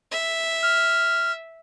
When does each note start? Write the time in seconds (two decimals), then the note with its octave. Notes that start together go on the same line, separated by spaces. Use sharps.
0.11 E5
0.63 F6